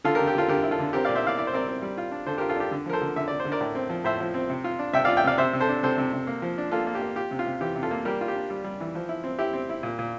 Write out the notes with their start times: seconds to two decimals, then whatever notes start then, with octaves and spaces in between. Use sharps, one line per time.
0.04 D3 F4 A4
0.15 G4 A#4
0.20 D3
0.27 G4
0.35 D3 F4 A4
0.48 D3 G4 A#4
0.63 E4
0.71 F4 A4
0.79 D3
0.93 C4 G4 A#4
1.05 A#2 D5 F5
1.15 C5 E5
1.24 E4 D5 F5
1.38 E4 D5
1.47 C5
1.53 C4 A#4 D5
1.68 C4
1.82 G3
1.98 F4
2.12 D4
2.26 D3 A4 C5
2.38 F4 G4 A#4
2.49 F4 A4
2.56 D4 G4
2.71 D3
2.86 F3 A#4
2.93 A4 C5
3.02 D3
3.16 D3 E5
3.28 D3 D5
3.40 C5
3.45 D3
3.52 A#4 D5
3.61 A2
3.75 C4
3.90 F3
4.04 A2 C5 E5
4.20 F3
4.34 C4
4.50 C3
4.64 F4
4.79 D4
4.93 C3 E5 G5
5.05 F4 D5 F5
5.17 E5 G5
5.24 C3 D5 F5
5.38 C3 C5 E5
5.53 C3
5.60 A4 C5
5.69 D4
5.83 C3 A4 C5
5.98 C3
6.13 C3
6.27 A#3
6.42 F3
6.58 D4
6.71 A#3 F4 A4
6.87 A#3
6.95 G4
7.01 A#3
7.16 F4 G4
7.31 C3
7.39 F4
7.47 C3
7.61 E3 G4
7.76 C3
7.83 F4 A4
7.91 A#3
8.05 G3 G4 A#4
8.21 F4
8.28 G4
8.36 D4
8.50 G3
8.64 G3
8.80 E3
8.95 F3
9.09 E4
9.24 C4
9.39 E4 G4
9.53 C4
9.69 E4
9.83 A#2
9.99 A#2